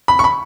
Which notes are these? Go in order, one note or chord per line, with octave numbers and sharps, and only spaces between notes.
B5
C#6
B5